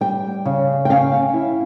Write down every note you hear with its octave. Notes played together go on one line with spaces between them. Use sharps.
G3 G5
C#3
G5
C#4 F5
E4